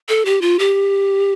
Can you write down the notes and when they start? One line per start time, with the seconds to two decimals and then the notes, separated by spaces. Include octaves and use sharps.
0.09 A4
0.25 G4
0.41 F4
0.59 G4